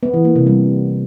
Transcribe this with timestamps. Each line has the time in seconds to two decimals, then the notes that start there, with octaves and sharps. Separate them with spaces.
0.03 B3
0.14 E3
0.25 A#3
0.36 C3
0.46 G3